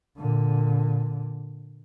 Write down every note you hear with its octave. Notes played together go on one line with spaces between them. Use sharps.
A#2 D3